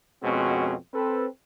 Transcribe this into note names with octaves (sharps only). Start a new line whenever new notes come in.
F2 B2 G#3 C4 C#4 F#4
C4 A4 B4